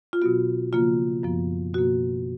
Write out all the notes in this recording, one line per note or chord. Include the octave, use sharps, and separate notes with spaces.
F4
B2 F#3 B3 F#4
C#3 F3 A#3 F4
F#2 F3 B3
B2 A#3 F#4